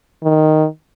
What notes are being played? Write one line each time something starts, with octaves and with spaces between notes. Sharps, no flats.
D#3